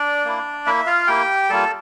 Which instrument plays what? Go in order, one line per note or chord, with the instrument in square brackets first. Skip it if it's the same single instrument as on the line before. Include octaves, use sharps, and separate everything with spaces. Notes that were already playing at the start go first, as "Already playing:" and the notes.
Already playing: [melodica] D4 D5
A#3 E4
A#3 E4 E5
F4 F5
A#3 E4 G4 G5
G3 A#3 F4 A4 A5